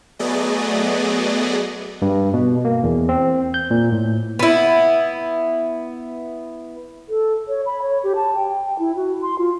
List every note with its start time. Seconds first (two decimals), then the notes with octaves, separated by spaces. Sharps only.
0.19 F#3 A3 B3 G#4 D5 D#5
2.02 G2
2.34 B2
2.65 A#3
2.83 E2
3.09 C4
3.54 G6
3.71 A#2
3.92 A2
4.39 B3 E4
7.09 A4
7.48 C#5
7.66 B5
7.82 C#5
8.04 G4
8.16 A5
8.35 G5
8.79 E4
8.96 F#4
9.22 C6
9.39 F4